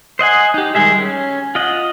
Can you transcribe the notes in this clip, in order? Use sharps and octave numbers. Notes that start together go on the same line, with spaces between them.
C5 D#5 F#5 G#5
D#4 G4
D#3 G3 G#3 G#4 E5
C#4
F4 D#5 F#5